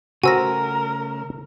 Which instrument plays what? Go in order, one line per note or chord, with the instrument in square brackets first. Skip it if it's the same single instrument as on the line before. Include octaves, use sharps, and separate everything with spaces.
[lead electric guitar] C#3 A3 [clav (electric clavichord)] F#4 C5 [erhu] A#4 [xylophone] G#5 E6 A#6